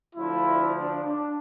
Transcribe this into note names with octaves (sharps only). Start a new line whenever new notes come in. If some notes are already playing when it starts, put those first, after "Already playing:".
D2 D3 F3 E4
D4
D4